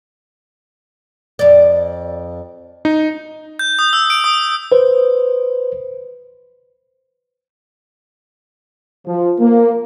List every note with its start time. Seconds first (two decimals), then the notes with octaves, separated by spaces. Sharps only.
1.39 F2 D5
2.85 D#4
3.59 G6
3.79 D#6
3.93 E6
4.10 D7
4.24 D#6
4.72 B4 C5
9.06 F3
9.40 A#3